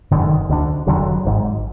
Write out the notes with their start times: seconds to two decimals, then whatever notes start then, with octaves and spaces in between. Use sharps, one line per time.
0.11 F#1 F#2 D3 D#3
0.49 D2 D3
0.87 F#1 F2 D3 F#3
1.25 G#1 G#2